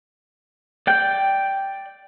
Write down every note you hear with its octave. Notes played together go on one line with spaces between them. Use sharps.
D5 G5 G6